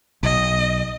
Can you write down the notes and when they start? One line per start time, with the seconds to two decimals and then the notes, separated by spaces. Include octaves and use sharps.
0.23 B1 D#5